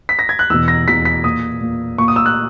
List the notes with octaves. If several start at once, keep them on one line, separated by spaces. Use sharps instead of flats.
B6
A#6
G#6
F#6
E2 B2 E6
A#6
E2 B2 B6
B6
A#2 D#6
A#2
A#2 C#6
D#6
E6
F#6